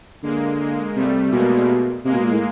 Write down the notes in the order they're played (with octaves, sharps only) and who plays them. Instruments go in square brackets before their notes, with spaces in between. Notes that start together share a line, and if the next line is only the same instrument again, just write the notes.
[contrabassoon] D3 [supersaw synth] G#3 A#3
[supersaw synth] G#3
[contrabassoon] C3 [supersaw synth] G3 A3
[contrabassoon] B2 [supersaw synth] G#3 A#3
[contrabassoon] C3 [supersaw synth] G#3 A#3
[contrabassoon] B2
A#2
A2